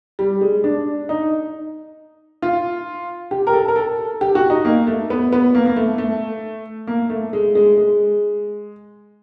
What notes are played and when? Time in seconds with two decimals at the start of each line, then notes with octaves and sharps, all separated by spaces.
0.19 G3
0.41 G#3
0.64 D4
1.09 D#4
2.42 F4
3.31 G4
3.47 A#4
3.53 A4
3.68 A#4
3.76 A4
4.21 G4
4.35 F#4
4.50 D#4
4.65 A#3
4.87 A3
5.10 B3
5.33 B3
5.55 A#3
5.66 A#3
5.76 A3
5.98 A3
6.87 A#3
7.10 A3
7.33 G#3
7.55 G#3
7.78 G#3